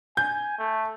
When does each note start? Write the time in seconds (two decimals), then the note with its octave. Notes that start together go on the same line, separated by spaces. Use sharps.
0.17 G#5 G6
0.58 A3